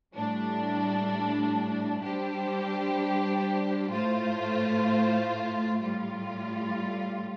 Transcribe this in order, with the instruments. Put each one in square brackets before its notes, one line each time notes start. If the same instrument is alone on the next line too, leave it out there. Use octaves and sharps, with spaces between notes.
[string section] A2 G3 D4
G3 D4 G4 C5
A2 A3 F4 C5
A2 G3 F4